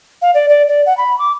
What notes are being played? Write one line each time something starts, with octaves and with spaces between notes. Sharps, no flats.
F5
D5
D5
D5
F#5
B5
D6